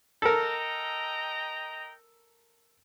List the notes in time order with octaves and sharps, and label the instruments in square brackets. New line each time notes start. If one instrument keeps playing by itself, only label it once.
[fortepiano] A4 A#4 [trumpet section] D#5 G5 A#5